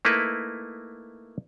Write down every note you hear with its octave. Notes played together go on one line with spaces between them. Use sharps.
A3 A#3 D#4 E4 B4